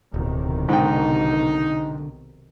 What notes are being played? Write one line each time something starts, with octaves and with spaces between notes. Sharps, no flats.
D1 B1 C3 D#3
G#2 D3 D#4 G5